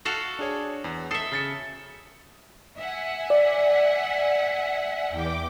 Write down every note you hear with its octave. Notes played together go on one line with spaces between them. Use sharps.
F#4 A4 F5
D4 G#4 C#5
E2
A4 E5 D#6 C7 C#7
C#3 A6 C#7
E5 F#5 G#5
D5
E2 G5 D6